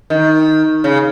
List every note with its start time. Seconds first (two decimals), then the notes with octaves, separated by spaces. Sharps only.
0.10 D#3
0.84 C#3